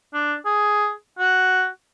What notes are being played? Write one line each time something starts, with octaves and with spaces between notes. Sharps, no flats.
D4
G#4
F#4